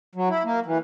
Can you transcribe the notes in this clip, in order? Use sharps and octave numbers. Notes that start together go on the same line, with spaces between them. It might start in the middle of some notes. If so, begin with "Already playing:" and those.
F#3
E4
A#3
E3